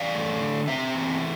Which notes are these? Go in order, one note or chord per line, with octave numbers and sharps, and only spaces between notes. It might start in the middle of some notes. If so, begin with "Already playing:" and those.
Already playing: E2 D5 F5
A3
D3
C4 C5 E5
E2